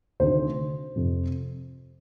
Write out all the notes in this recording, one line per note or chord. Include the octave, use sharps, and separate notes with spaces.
D2 C3 D#3 C5
F2 C3 F3